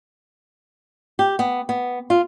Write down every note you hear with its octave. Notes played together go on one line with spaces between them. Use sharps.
G4
B3
B3
F4